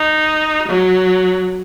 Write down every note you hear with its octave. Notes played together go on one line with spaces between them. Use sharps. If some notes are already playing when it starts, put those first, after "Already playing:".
Already playing: D#4
F#3